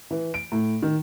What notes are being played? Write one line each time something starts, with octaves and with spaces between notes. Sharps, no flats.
E3
D7
A2
D#3